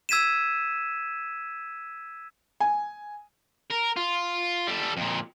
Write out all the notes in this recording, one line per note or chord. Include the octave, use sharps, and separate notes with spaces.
E6 G#6 B6 D#7 E7
G#5
A#4
F4
G3 A4
F2 A#2